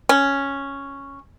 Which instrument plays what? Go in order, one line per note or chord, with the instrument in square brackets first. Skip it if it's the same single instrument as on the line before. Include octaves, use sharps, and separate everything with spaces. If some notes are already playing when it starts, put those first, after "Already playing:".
[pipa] C#4